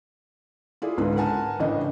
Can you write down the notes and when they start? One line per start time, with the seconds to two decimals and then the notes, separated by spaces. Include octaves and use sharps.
0.82 E4 F4 G#4 D5
0.98 C#2 G#2 D3 B3 B4
1.16 A#4 B4 F#5 G#5 A5
1.60 A1 A2 C#3 D4 D#5